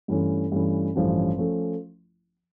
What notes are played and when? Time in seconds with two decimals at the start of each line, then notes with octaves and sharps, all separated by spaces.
0.08 G2 E3 A3 C#4
0.52 G2 E3 A3 C#4
0.95 A1 G2 F3 A3 C#4
1.38 F3 A3 C#4